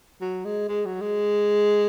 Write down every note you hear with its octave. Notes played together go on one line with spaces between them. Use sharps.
F#3
G#3
G#3
F#3
G#3